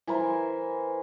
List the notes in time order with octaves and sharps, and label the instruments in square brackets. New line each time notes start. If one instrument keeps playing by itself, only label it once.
[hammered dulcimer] E3 E4 A#4 C5